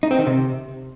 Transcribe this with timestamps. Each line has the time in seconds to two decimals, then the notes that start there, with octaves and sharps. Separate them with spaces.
0.03 D#4
0.11 C4
0.19 D#3
0.27 C3